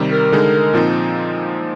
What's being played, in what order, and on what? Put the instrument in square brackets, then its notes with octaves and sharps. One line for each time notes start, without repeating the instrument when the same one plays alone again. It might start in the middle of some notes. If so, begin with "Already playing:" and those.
Already playing: [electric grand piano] C3 D#3 G3
[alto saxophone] A#4
[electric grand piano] D3 G#3 D#4
A#2 F3 C4 D#4